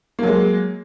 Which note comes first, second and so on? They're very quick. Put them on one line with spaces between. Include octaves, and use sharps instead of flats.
A#3 F#3 G#3